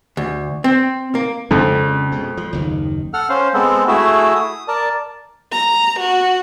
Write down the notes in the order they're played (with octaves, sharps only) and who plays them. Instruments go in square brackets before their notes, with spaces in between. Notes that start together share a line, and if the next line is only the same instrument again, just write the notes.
[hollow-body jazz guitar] D2
C4
A#3
[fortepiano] F2 [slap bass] C#3 G#3 D4
[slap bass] B2 G#3
F3
F#1 D#2 D#3
[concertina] A4 F#5 F6
C#4 C5 F5
G#3 B3 C4 A4
A3 E4 F#4 G#4 E5
D#6
A#4 D5 A5
[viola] A#5
F#4